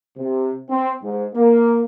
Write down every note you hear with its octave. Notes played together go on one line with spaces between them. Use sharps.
C3
C4
G#2
A#3